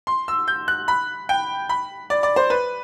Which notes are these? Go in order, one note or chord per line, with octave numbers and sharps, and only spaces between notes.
C6
E6
G6
F#6
B5
G5
B5
D5
D5
C5
B4